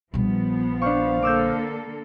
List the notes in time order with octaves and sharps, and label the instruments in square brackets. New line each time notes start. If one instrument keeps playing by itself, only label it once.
[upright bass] A#1 G3 [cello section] F3 B3
[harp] D4 C#6 [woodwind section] C5 F5
[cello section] D3 A#3 A4 [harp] D6 E6 G6